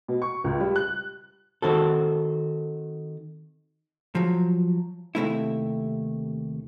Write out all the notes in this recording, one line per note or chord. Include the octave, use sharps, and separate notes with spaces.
B2
C#6
C#2
G3
F#6
D#3 C4 F#4 A4
F3 F#3
D#2 C3 A3 E4